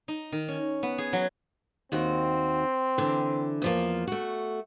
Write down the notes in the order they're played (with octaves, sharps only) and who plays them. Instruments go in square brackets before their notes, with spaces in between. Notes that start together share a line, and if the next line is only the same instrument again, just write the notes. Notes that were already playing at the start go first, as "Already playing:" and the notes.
[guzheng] D#4
D#3
C#4
B3
G#4
F#3
[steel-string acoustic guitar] D#2 D#3 F#4 [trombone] C4
[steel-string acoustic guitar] D3 E3
E2 F3 A#3
A3 F#4